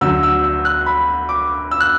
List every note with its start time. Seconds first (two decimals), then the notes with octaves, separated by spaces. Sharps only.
0.01 D2 D3 F#3 E6
0.23 E6
0.44 E6
0.65 F#6
0.86 B5
1.29 D6
1.71 E6
1.80 F#6